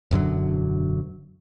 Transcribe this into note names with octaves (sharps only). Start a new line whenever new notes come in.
E1 F#2 D3 F#3